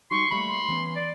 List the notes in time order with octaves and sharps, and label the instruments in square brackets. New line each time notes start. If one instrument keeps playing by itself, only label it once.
[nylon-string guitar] G3 D#4 F#4 [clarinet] C6 [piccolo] C#6
[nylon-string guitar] G3 A3 A#3 [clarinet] B5
[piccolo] C6
[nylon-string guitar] E3 B3 C#4
[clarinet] D5